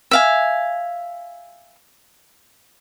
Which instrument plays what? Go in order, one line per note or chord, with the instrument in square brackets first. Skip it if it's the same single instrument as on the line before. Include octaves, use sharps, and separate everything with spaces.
[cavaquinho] E5 F5 G#5